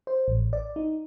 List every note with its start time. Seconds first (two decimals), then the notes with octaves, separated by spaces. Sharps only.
0.07 C5
0.28 A1
0.53 D5
0.76 D#4